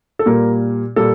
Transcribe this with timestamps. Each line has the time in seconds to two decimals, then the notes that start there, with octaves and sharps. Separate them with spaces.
0.19 A4
0.26 A#2 G3 A#3 A#4
0.96 A#2 G3 A#3 A4